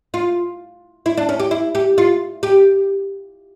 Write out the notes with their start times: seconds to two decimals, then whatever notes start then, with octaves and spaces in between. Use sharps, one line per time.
0.14 F4
1.06 E4
1.17 D4
1.29 C#4
1.40 G4
1.51 E4
1.75 G4
1.98 F4
2.43 G4